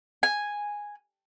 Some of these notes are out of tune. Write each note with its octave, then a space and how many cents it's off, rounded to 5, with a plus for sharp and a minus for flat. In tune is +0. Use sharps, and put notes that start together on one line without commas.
G#5 -5